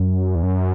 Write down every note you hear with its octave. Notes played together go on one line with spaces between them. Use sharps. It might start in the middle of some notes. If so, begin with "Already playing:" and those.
Already playing: F#2
E2
F#2